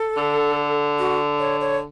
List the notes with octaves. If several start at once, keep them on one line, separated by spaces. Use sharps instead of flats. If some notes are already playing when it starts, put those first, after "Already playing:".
Already playing: A4
D3
F#4
C#5
C#5